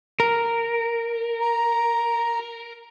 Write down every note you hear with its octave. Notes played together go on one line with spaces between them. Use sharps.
A#4
A#5